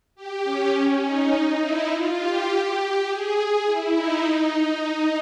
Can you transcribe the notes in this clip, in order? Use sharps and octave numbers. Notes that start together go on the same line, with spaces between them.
G4
C#4
D#4
E4
F4
G4
G#4
E4
D#4
D#4